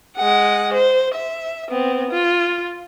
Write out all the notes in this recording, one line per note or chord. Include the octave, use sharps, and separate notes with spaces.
G#3 F#5
C5
E5
B3 C4
F4